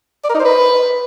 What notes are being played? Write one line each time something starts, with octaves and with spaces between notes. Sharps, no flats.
D5
A#4
D#4
C5
B4